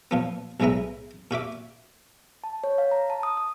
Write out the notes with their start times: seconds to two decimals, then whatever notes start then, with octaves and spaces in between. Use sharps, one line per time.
0.11 A#2 F3 B3
0.60 B1 A2 G#3 B3 E5 A#5
1.31 A#2 F#4 E5 D6
2.44 A5
2.64 C#5
2.78 F5
2.91 A#5
3.10 A5
3.23 D#6
3.37 D#6